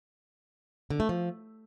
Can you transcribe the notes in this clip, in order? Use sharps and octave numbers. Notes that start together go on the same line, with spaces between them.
D3
A3
F3